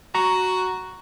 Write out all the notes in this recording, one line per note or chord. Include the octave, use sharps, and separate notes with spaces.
F#4 A#5 C#6